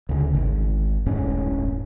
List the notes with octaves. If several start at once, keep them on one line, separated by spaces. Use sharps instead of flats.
D2 C#3
G#1
D#1 A1 G#2 C#4